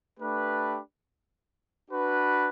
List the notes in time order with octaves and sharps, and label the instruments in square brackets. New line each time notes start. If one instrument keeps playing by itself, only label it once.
[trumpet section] A3 D4 G4 B4
D4 F#4 B4